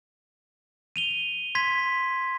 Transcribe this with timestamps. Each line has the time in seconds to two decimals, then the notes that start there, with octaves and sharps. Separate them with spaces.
0.96 D#7 F7 G7
1.55 C6 G#6 B6